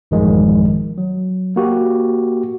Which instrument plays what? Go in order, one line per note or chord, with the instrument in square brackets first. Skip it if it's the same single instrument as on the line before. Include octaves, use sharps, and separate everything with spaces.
[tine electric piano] A1 F#2 D#3 F3 G3 G#3
F#3
A#3 F#4 G4